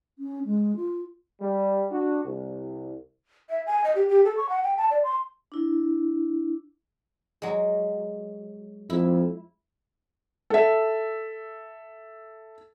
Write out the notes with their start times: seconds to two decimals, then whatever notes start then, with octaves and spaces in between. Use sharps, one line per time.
0.19 C#4
0.45 G#3
0.76 F4
1.41 G3
1.91 D4 F#4
2.25 C2
3.50 E5
3.67 G#5
3.84 D#5
3.95 G4
4.09 G4
4.25 A4
4.37 C#6
4.49 F#5
4.63 G5
4.77 A5
4.91 D5
5.03 C6
5.52 D4 E4
7.42 F#3 G#3
8.90 F2 E4
10.50 A4 E5